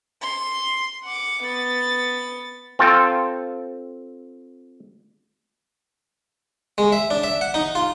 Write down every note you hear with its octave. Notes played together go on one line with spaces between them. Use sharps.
C6
F#5 D6
B3 A6
C4 F4 A4 G5
G#3
E5
D4
E5
F#5
D#4
F4